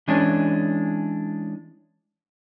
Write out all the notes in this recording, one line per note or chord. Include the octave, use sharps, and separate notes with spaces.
E3 G#3 C#4 D4